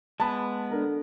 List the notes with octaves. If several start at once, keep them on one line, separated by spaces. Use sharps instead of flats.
G#3 B3 A5 B5
D3 A#4